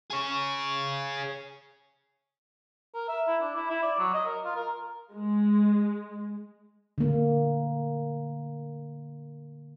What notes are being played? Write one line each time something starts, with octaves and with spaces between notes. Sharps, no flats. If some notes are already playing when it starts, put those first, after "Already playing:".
G#4 C#5
A#4
E5
E4
D4
E4
E4
D5
F#3
D#5
A#4
F4
A#4
G#3
D3 A#3